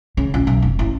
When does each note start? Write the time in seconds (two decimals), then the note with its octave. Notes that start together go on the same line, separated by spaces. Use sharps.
0.17 C#3
0.34 A#1
0.47 B1
0.62 F1
0.79 A1